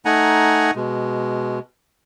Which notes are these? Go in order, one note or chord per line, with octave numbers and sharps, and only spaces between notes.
A3 D#4 F#5 G#5 A#5
B2 G#3